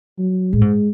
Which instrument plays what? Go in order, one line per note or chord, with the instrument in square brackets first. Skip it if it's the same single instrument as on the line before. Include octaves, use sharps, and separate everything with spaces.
[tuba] F#3
[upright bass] A2 [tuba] G#3
[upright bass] G#2